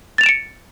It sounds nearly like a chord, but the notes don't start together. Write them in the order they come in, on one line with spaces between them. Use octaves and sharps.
A6 F7 E7 D7 C#7